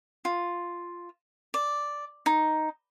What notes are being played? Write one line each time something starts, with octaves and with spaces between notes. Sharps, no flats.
F4
D5
D#4